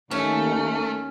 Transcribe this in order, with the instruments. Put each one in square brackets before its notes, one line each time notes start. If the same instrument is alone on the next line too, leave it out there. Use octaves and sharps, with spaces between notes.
[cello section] D#2 [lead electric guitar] A3 [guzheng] C#4